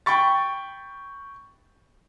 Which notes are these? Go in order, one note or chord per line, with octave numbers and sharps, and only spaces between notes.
G5 B5 C#6 A6